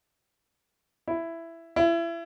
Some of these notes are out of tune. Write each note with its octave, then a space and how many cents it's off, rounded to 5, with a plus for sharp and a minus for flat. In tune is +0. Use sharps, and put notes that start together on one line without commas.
E4 +10
E4 +30